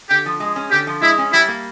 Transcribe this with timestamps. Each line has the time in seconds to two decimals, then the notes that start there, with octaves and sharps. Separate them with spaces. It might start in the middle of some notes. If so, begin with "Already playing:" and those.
0.10 D3 G4
0.26 F3
0.40 G#3
0.56 C#4
0.71 D3 G4
0.87 F3
1.02 G#3 E4
1.18 C#4
1.33 G3 E4
1.48 A#3